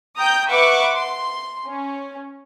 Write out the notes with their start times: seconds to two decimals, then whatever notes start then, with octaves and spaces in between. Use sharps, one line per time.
0.18 G5 A#5 D#6 G6
0.50 B4 E5 F#5 C#6 D6
0.96 C6
1.68 C#4